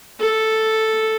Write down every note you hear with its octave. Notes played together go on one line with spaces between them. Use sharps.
A4